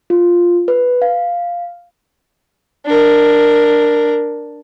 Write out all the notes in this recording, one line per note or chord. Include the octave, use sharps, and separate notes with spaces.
F4
B4
F5
D4 A#4